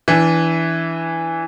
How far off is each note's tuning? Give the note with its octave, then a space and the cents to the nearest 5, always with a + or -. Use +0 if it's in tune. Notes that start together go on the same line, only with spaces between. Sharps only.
E3 +0 D4 -25